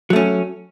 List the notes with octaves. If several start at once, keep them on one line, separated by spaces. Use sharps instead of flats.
F#3 A3 C#4